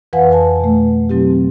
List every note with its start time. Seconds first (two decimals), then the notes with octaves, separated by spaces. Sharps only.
0.13 F2 E3 B4 F5 F#5 G#5
0.32 B4 G#5 A5
0.60 B2 A3
1.10 B2 F#3 C4 E4 G4